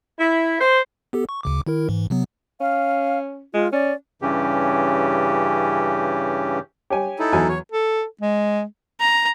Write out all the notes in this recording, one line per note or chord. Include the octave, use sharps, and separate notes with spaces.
E4
C5
B3 G4 A4
C#6
D2 C#3 D6
D#3 E4 A#4
G#2 E3
C3 F#3 B3
C#4 F5
G#3 F4
C#4 D5
G2 C#3 E3 C#4 G4
G4 C#5 G#5
D#4 E4 A4
E2 F#3 G#5
C#5
A4
G#3
A#5